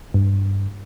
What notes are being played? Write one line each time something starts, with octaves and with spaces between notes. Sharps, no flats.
G2